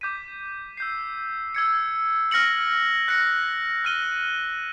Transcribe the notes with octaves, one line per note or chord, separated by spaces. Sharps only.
D6 G6 B6 D#7
E6 G6 C7
E6 G#6 C#7
F6 A#6 C#7 F#7
F#6 A#6 C#7
F6 A#6 D#7 G7